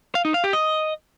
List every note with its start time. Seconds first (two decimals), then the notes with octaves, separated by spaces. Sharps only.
0.15 F5
0.25 D#4
0.34 F5
0.44 G4
0.53 D#5